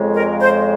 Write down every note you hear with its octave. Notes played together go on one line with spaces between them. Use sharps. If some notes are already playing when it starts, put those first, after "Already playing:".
Already playing: F2 C#3 G#3
A#4
C5